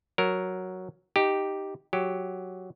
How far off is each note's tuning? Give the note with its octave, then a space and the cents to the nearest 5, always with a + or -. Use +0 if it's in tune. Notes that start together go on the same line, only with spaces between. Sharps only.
F#3 +0 A#4 +0
D#4 +0 G4 +0
F#3 +0 G4 +0